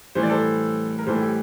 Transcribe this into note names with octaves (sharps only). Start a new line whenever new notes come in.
A2 E3 G3 C5
D5
A4 C5
A#4
A2 E3 G3 A4 C5
G4